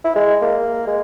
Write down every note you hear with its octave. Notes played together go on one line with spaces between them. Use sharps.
E4
G#3
A#3
G#3